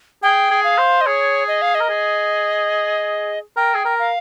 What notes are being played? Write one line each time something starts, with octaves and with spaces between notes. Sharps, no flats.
G#4 G5
G#4
F5
C5
D#5
G#4 C#5
D#5
F5
D#5
A#4
G#4
A#4 G5
G#4
A#4
F5